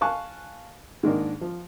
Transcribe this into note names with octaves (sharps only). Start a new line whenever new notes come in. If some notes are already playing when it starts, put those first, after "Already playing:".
F5 G#5 A5 C#6 F#6
G#2 D#3 A#3 D4
F3